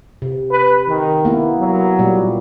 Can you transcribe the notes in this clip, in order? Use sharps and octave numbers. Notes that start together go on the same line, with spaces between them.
C3
B4
D#3
A#3 B3 E4
F#3
A#2 G3